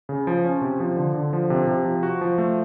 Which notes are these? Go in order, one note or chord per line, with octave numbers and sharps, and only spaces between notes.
C#3
F3
C#4
C3
F3
D3
D3
F3
C3
C3
F3
F#4
F3
A3